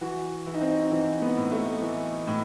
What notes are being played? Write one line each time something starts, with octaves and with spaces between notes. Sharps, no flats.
E3 F#4
E3 E4
D#4
C4
D#4
D#4
E3 C4
B3
A2
A3
E3
A2